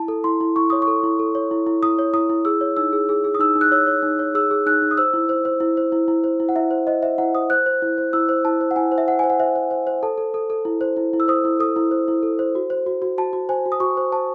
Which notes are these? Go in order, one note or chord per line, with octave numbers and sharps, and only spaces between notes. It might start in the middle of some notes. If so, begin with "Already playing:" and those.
Already playing: E4 A5
A4
E4 C6
E4
E4 C#6
C#5 D#6
C#6
A4
E4
A4
C#5
E4
E4
E4 D#6
C#5
E4 D#6
E4
G#4 E6
C#5
D#4 E6
G#4
G#4
G#4
D#6
D#4 E6
D#4
F#6
C#5 E6
C#5
D#4
C#5
G#4 E6
G#4
D#4 F#6
D#4
D#6
C5 E6
E4
C5
C5
E4
C5
E4
E4
C5
E4
F#5
E4 E5
C5
C5 D#5
C5 E5
E4 F#5
C5 D#6
C5 F#6
C5
E4
C5
E4 E6
C5
E4 A5
C5
F#5
E4 G#5
C5
E5
C5 F#5
C5 G#5
F#5
C5 E5
C5
C5
C5
A4 A5
A4
A4
A4
E4
C5
E4
E4
E6
C5 D#6
E4
A4 D#6
E4
C5
E4
A4
C5
F#4
C5
F#4
F#4
F#4 A5
F#4
C5 G#5
F#4
D#6
F#4 C#6
C5
C5 A5